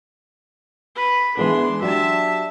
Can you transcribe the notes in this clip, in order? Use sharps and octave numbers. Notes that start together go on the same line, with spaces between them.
B4
E3 G#3 B3 D4 C6
F#3 D4 G4 E5 A5